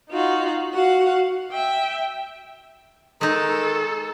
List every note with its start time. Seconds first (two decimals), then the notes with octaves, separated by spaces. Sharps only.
0.11 D#4 F4 F#4
0.74 F#4 F5 F#5
1.52 E5 G5
3.21 D#3 G#3 D#4 A4